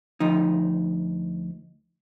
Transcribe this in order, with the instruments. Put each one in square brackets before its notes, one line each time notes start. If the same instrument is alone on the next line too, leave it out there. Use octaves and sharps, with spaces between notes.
[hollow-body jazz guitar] D2 F3 D#4